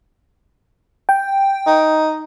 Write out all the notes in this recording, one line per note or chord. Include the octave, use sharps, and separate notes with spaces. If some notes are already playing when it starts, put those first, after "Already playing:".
G5
D#4